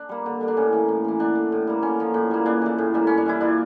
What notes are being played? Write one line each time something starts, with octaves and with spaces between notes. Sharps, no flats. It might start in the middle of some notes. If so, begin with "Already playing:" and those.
Already playing: D4
G3 A#3
D3
G3 A#3
D4
A2 C#4
E3 A#3
A2
E3 A#3
D3 D4
A3
A2
G3 A#3
D3 C#4
F3 A#3
A2
G3 A#3
C#3 D4
E3 A3
A2
G3 A#3
G2 C#4
D4
E3 G3 E4
A#2 D4 F4